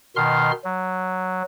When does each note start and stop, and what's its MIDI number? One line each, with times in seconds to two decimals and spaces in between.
0.16 0.52 47
0.16 0.52 51
0.16 0.52 84
0.16 0.52 89
0.64 1.43 54